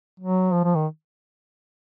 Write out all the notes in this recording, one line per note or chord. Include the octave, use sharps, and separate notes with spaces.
F#3
F3
F3
D#3